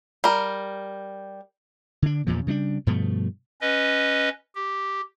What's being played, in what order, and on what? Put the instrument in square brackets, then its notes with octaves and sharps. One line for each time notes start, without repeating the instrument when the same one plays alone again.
[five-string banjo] G3 A#4
[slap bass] D3 D4
E2 G2 A#2 F3
C#3 G3 A#3 D4
G2 B2 F3 A3
[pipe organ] C#4 B4 D#5
G4